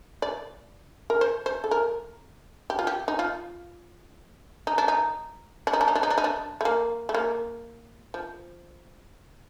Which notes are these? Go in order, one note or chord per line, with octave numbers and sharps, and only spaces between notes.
D5
A#4
C5
C5
A4
A#4
G4
F4
G4
D#4
F4
D#4
D4
D#4
D4
D#4
D4
D#4
D4
D#4
D4
D#4
D4
A3
A#3
A3
A#3
F3